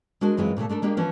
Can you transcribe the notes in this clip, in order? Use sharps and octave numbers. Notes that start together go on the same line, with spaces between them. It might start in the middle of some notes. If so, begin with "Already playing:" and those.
G#3 D4 F#4 A#4 C5
F#2 E3 G#3 C4 F4
A#2 C#3 F3 A3
A3 D4 A4 A#4
G#3 A#3 D4 G4
E3 F3 C#4